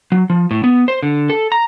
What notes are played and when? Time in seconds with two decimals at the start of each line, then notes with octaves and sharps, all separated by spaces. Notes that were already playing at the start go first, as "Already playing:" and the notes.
0.12 F#3
0.30 F3
0.51 A2
0.64 B3
0.88 C5
1.03 D3
1.30 A4
1.52 A#5